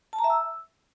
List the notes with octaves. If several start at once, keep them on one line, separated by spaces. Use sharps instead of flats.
A5
A#5
E5
E6